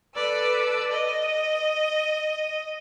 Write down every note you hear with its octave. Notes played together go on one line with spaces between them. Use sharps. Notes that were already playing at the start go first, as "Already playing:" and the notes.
A4 B4 D5 E6
D#5